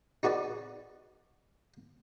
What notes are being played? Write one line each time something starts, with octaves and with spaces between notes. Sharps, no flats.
D#4 F#4 G#4 B4 D5